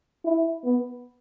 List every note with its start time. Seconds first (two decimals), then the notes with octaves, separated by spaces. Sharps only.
0.25 E4
0.64 B3